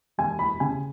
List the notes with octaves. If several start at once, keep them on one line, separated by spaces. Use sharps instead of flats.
E1 G#5
E2 B5
C#3 G#5